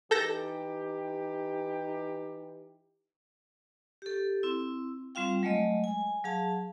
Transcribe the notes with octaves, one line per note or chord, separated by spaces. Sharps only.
E3 D#4 G4 A4 G6 A#6
G4 A4
C4 E4
G3 C4 F4 F5 G5
F#3 G#3 A3 D#5
G#5
F#3 G#4 F5 A5